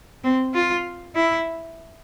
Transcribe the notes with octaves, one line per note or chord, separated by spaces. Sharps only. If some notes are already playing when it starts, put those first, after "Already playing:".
C4
F4
E4